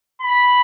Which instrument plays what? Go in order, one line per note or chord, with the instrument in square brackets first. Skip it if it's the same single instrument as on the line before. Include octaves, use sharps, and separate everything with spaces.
[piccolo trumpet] B5